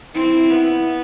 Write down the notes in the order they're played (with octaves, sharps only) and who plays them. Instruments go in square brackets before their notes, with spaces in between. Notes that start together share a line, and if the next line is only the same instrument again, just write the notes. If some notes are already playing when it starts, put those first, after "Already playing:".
[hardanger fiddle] C4 [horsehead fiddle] E4
[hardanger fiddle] B3